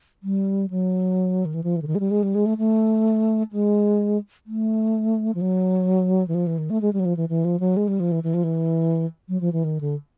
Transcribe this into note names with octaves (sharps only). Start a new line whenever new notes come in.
G3
F#3
D#3
E3
F3
E3
D3
D#3
G#3
G3
G#3
G3
G#3
A3
A3
G#3
A3
F3
F#3
E3
F3
E3
D#3
A3
G#3
G3
F#3
F3
E3
E3
F3
F#3
G#3
G3
F3
E3
E3
F3
E3
F#3
F3
E3
D#3
D3